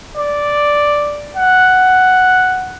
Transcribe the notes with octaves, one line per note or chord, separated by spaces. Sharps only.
D5
F#5